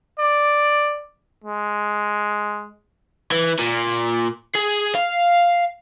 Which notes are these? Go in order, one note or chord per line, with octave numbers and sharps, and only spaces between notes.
D5
G#3
E3
A#2
G#4
F5